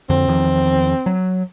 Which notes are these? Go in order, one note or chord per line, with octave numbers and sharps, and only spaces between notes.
F2 D3 C4
E2 D#3 F3
F#3